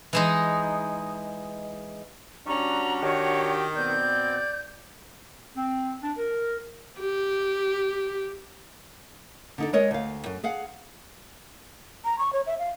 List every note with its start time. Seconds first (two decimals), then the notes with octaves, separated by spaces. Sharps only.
0.13 E3 G#3 D#4
2.47 G3 C#4 D4 F#4 A#5
3.03 D#3 G4 C#5
3.76 B2 B3 C4 D5 G6
5.56 C4
6.02 D4
6.17 A#4
6.99 G4
9.58 D3 D#4 A4
9.73 G#3 A#4 C#5 D#5
9.91 D2 F5
10.26 F#2
10.44 G#4 F5 F#5
12.05 A#5
12.19 C#6
12.33 C#5
12.47 E5
12.59 F5